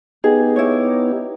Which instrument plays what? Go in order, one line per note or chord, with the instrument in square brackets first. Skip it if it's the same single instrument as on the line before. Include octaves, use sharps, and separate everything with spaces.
[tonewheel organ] B3 D#4 G4 [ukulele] G#4
[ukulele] E4 C#5